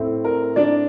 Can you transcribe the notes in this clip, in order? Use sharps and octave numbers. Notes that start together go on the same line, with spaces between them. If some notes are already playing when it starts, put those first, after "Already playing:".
Already playing: A2 A3 C4
A#4
D4 D5